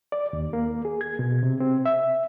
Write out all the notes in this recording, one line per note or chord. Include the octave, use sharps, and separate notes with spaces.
D5
D#2
A#3
G#4
G#6
B2
C3
C4
E5